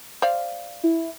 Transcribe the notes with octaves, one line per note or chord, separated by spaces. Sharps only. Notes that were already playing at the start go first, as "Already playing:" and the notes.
C5 D5 F5
E4